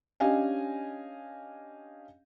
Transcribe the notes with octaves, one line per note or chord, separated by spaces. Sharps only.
C#4 D4 G4 D#5 F5 G#5